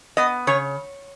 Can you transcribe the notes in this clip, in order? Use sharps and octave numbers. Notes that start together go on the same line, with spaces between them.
B3 D#5
C#3 C#5